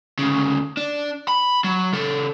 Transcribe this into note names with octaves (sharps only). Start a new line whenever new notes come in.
D2 C#3
D4
B5
F#3
C#3 A4